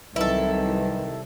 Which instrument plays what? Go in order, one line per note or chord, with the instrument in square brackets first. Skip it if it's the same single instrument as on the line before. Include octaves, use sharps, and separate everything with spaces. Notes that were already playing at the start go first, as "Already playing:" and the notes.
[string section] C2 [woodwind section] D#3 E3 F#3 [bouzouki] E4 A4